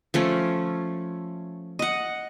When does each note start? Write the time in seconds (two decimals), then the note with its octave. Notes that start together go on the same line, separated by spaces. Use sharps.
0.14 F3 A3 C#4
1.79 D#5 F#5